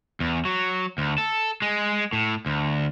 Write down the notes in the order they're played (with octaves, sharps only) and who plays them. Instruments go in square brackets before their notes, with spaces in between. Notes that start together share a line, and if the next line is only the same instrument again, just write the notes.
[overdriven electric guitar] E2
F#3
D2
A4
G#3
A2
D2